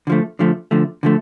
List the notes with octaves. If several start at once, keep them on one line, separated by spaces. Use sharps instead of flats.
D3 F3 A3
D3 F3 A3
D3 F3 A3
D3 F3 A3